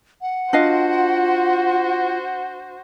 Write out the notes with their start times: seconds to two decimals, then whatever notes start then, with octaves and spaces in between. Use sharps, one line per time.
0.21 F#5
0.53 D4 F4 F#4 C5 D#5 F5